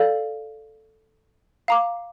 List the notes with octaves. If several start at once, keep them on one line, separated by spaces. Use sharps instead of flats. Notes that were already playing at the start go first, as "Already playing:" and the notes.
Already playing: A4 D5 F5
F5 A#5 D6